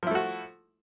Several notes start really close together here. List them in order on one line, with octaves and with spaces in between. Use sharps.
F3 E4 A3 F#4